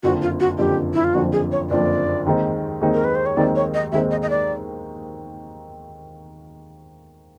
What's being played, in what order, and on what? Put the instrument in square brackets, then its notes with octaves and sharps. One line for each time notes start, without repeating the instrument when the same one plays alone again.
[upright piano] F#1 F2 D3 F3 [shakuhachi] F#4
[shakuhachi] F4
F#4
[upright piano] F#1 F2 D3 F3 [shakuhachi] G4
[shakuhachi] E4
F4
[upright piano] F#1 F2 D3 F3 [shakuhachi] F#4
[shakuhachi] G#4
C#5
[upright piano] F#1 F2 D3 F3 [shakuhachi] D5
[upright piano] D#2 D#3 G#3 C4 D#4
D#2 D#3 G#3 C4 D#4
[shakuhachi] A#4
B4
C5
C#5
[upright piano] D#2 D#3 G#3 C4 D#4 [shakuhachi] D5
[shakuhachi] C#5
D#5
[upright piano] D#2 D#3 G#3 C4 D#4 [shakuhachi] E5
[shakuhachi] D#5
D#5
D5